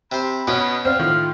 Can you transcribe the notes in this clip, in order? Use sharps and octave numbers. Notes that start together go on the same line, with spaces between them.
C3 C5 B5
B2 B3 C#4
C4 D5 F5
A2 D#3 F4